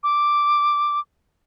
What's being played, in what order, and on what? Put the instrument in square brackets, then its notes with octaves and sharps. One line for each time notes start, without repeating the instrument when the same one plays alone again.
[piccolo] D6